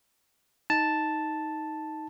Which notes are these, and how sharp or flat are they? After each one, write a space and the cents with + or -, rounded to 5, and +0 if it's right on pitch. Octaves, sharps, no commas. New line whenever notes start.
D#4 +10 A5 +0